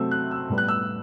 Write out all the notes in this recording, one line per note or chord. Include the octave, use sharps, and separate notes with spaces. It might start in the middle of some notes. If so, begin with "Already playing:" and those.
Already playing: C3 F#3 A3 C4 E6
F#6
E6
A2 G3 B3
F#6
E6